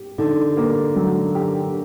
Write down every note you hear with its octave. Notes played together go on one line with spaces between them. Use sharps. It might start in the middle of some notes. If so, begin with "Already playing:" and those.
Already playing: G4
D3 D#4
A#3
F#3
G4